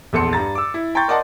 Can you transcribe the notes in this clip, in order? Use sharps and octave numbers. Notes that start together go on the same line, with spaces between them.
A#1 E2 A4 C6 C#7
G2 A#5 A6
D6 E6
E4
G5 A#5 C6 C#6 G6 A6
A#4 D5 D#5 F#5 A5 C6